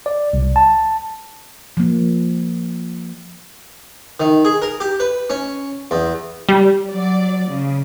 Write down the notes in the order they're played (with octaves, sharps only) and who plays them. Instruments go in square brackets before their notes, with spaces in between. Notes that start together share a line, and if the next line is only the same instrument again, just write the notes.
[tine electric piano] D5
C2
A5
[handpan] F3 A#3
[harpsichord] D#3
G#4
A#4
G4
B4
C#4
E2
[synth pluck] G3
[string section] F#3 D5
C#3